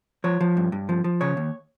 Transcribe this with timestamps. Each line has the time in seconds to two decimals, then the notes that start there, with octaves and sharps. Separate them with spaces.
0.24 F3 C#5
0.41 F3
0.57 G2
0.72 G2
0.89 F3
1.04 F3
1.21 C#3 C#5
1.37 D#2